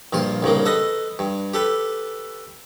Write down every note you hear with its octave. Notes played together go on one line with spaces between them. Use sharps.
A#1 G2 F4 C6
C2 G2 C#3 A#3
A4 B4 D#5
G2
G4 A4 B4